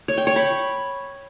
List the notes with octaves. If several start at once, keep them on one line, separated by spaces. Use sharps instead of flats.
C#5
G5
C#5
B5